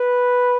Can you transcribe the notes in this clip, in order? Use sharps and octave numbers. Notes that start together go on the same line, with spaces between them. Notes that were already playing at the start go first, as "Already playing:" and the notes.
Already playing: B4